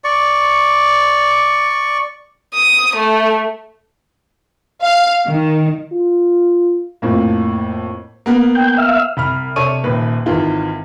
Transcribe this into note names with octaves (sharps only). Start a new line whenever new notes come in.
D5 C#6
D#6
A3
F5
D#3
F4
F2 A2 A#3
A#3 B3
G5
E5 F5
C2 B5 F6
C3 D4 A4 C#5 C#6 D#7
D#1 D#2 B4
G#1 D#3 E3 F4